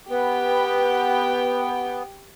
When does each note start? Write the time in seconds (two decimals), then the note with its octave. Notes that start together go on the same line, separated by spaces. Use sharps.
0.10 B3 G4 B4 G5